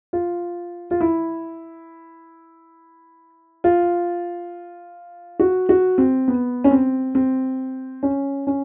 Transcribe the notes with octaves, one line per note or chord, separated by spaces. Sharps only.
F4
F4
E4
F4
F#4
F#4
C4
B3
C#4
C4
C4
C#4
C#4